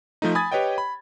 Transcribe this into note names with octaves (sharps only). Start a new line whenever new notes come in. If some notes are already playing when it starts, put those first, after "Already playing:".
F3 A3 D#4
G#5 B5 D#6 G#6 A6
G4 B4 C#5 D#5 G5
B5